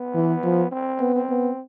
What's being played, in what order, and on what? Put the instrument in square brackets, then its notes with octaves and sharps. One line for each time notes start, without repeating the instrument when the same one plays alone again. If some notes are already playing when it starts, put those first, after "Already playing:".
Already playing: [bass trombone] B3
[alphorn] E3
F3
[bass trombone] C4
[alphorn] B3
[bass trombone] C4
[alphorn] B3